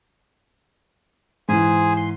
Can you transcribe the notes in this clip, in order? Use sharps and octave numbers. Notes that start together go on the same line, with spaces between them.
G#2 E3 G#4 C5 G#5
C6